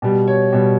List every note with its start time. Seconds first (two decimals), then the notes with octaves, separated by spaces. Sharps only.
0.02 B2 G3
0.28 C#5
0.53 B2 G3